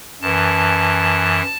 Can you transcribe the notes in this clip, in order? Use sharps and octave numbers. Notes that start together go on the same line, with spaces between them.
F#2 E3 A5